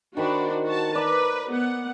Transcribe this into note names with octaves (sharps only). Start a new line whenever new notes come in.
D#3 D4 F#4 C5 B5
F#4 A5
B4 D5 A#5
B3 F#5